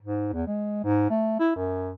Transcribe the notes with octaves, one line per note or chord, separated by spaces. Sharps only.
G#2
E2
G#3
G#2
A3
E4
F#2